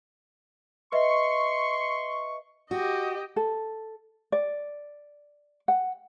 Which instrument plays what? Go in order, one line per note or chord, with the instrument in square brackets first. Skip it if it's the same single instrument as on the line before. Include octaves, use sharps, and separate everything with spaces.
[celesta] B4 D#5 E5 [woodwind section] C6 C#6
[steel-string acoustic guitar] F#4 [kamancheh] G4 D#5
[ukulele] A4
D5
F#5